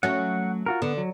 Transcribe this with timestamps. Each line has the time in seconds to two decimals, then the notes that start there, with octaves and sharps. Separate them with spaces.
0.03 F#3 A3 C#4 F#5
0.66 F4 F#4 A#4
0.82 D3 B3
0.98 F#3